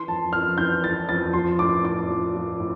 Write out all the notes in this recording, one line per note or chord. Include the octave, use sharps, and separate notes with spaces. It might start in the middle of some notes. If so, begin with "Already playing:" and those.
Already playing: E3 C6
F2 A5
F2 F6
E3 G6
E3 A6
F2 A6
F3 C6
A2 D6
A2 D6
F3
F3
A2